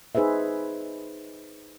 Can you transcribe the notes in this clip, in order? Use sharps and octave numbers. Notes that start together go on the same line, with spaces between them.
D#4 G#4 B4 C5 E5